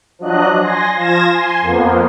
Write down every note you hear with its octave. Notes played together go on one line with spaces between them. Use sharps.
F3 F#3 D4 D#5 F#6
G#5 C6 A#6
F3 F4 G#6 A#6 E7
G#5 C6
F2 F3 A#3 B3